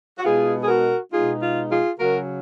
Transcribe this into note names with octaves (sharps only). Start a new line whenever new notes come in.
F#4
B2 G#3 B3 D#4 F4 G#4
G#4
F#4 A#4
B2 G#3 B3 D#4 F4 G#4
F4
F4 G#4
C#3 F#3 C#4 F#4 A#4